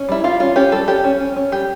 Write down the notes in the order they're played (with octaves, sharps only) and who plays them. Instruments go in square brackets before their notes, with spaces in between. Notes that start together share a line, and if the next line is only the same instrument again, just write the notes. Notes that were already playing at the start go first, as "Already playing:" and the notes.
Already playing: [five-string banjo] C#4
G3 E4
G3 F4
C#4 F4
C#4 G4
G3 A4
C#4 G4
C#4
C#4
C#4
G3 G4